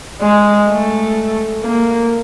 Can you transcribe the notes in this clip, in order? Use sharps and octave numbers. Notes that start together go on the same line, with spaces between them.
G#3
A3
A#3